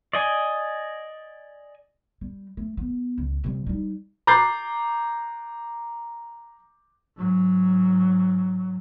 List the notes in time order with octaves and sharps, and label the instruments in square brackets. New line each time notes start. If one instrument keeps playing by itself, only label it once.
[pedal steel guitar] D5 D#5 G#5
[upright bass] G3
A3
B3
C#2
C3 G3
G3 D#4
[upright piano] A#5 D6 F#6 G6 A6 C7
[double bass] G#2 F#3